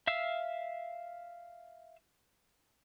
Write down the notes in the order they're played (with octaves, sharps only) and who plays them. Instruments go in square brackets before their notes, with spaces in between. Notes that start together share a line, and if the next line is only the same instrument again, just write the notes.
[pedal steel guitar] E5 F5 E6